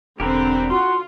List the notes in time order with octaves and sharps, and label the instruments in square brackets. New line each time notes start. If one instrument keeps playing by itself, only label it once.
[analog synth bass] E1 [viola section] D3 C4 [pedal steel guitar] G4 A#4 B4
[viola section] F4 [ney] F#4 [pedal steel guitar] C6